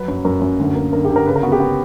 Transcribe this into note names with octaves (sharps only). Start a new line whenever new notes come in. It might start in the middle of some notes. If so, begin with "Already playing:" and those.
Already playing: F#3 B4
F#2
F#2 A#4
F#2
D2
A#3
D3 A#4
G4
D3
A#4
C#3 B4
A#4
B3 F#4
G4
B3